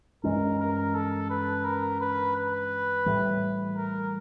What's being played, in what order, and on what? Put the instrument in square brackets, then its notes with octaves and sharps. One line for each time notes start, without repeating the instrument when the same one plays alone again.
[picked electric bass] G2 E3 G#3 C#4 [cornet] A#4
[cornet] A#4
A4
B4
A#4
B4
B4
[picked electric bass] A2 E3 G3
[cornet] A#4